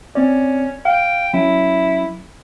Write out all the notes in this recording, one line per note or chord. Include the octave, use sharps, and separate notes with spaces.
C4 C#4 D5
F5 G5
F#3 C#4 E4